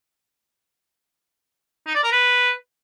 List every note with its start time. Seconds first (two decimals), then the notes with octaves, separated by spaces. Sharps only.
1.86 D#4
1.95 D5
2.04 A#4
2.12 B4